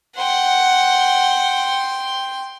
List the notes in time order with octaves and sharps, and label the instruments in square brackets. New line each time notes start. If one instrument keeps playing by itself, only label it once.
[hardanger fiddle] F#5 [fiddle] G5 C6